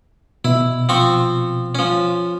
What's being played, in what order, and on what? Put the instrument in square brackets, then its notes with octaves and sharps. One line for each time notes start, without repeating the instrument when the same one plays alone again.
[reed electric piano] B2 [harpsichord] E4
[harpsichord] F3 C4 C#6
F3 C#4